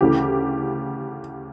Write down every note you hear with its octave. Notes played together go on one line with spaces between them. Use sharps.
D2 C#3 E3 G4